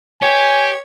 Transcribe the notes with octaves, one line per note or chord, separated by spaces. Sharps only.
G4 C#5 G#5